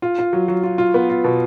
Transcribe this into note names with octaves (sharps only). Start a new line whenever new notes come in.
F4
F4
F#3
F#3
F4
F4
B3
F4
B2